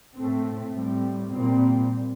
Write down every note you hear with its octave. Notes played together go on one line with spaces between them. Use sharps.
A2 A3 C4
A2 G3 C4
A#2 G3 C4